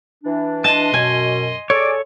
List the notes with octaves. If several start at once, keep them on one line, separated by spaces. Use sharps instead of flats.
E3 D4
D#5 A5 C6
F#2 B2 G#5
G#4 A4 C#5 D5 D6